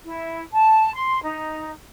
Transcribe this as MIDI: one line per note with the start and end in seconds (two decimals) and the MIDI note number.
0.04 0.43 64
0.53 0.93 81
0.95 1.22 84
1.22 1.72 63